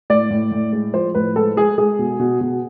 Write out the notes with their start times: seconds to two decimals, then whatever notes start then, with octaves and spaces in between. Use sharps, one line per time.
0.10 A2 D5
0.31 A2
0.52 A2
0.73 G#3
0.94 F3 C5
1.15 A2 B4
1.36 G#3 A4
1.57 G#3 G#4
1.78 G#3 G#4
1.99 B2
2.19 B2
2.41 B2